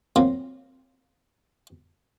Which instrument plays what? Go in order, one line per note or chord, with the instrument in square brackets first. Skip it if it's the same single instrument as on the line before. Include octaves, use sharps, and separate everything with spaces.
[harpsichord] F#3 A#3 C4 F4